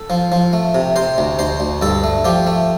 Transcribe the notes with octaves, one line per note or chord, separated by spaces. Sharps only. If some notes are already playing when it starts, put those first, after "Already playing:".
Already playing: A4
F3
F3
A3
C3
C3 C5
D2
D2 C5
D2
G2 A4
A3
F3 G4
A3